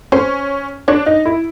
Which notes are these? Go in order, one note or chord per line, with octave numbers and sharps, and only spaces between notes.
C#4 C5
D4 C#5
D#4
E4